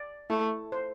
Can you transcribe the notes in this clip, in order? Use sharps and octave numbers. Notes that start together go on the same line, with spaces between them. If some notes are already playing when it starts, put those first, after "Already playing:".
Already playing: D5
A3 E4
C5